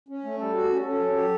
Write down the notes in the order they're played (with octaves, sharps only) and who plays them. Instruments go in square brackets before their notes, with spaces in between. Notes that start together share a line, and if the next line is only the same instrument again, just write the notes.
[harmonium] C#4
A3
[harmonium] G3 [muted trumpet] A4
[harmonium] F#4
C#4
[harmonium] C#4 [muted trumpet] A4
[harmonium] F#3
G4